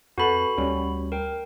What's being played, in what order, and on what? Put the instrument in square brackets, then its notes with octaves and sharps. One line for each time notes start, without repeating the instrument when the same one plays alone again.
[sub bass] F2 [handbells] F#4 B5 [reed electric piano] A4 B4 F#5
[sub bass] D2 [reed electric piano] G3 C#4
[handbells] A#4 G5